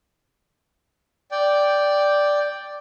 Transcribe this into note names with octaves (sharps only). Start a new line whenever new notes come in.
D5 G5